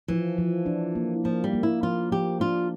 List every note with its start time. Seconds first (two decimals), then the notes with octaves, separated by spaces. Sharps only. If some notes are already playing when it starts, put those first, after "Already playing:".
0.08 E3 F3
0.38 F3
0.66 D4
0.95 A#3
1.24 F3 A#3
1.44 G3
1.53 A#3
1.63 E4
1.83 F3 F4
2.12 F3 G4
2.40 D4 F4